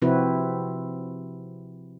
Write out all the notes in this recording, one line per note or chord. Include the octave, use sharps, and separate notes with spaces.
C3 F3 C4 E4 F#4 B4